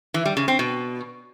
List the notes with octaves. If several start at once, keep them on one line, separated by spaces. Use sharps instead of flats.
E3
G3
C#3
C4
B2